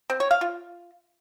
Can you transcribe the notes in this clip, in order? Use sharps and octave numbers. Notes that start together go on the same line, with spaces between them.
C4
C#5
F5
F4